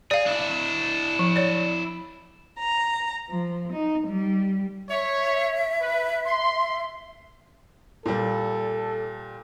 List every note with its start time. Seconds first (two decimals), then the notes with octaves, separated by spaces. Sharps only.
0.11 G#4 D5 F5
0.26 D4 E4
1.19 F3
1.36 C#5 D5
2.59 A#5
3.29 F3
3.73 D#4
4.07 G3
4.90 C#5 E5
5.81 B4
6.26 C6
8.06 A#2 G3 A4